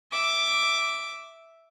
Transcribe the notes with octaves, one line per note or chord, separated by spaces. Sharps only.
E5 D6